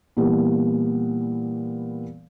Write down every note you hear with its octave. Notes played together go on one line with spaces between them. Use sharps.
A#2 E3 G3 B3